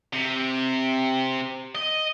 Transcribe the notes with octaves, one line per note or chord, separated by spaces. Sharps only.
C3
D#5